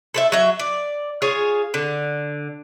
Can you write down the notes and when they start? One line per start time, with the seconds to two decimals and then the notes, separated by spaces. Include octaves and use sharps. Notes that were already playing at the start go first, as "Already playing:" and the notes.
0.14 A4 B4 E5
0.32 F#3 E5
0.60 D5
1.22 F4 G#4 C#5
1.74 D3